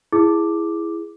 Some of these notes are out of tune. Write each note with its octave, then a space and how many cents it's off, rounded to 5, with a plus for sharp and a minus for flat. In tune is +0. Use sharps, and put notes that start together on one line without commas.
E4 +10 G#4 +0 D6 +0